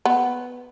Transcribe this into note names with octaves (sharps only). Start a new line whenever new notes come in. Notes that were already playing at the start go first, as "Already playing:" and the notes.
B3